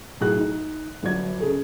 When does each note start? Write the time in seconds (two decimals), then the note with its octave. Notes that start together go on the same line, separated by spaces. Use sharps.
0.21 B1 A2 G#4 F#6
0.37 D#4
1.03 G1 F#3 D5 G#6
1.40 C#3 G#4 A4